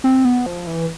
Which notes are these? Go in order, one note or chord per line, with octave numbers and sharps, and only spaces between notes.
C4
B3
F3
E3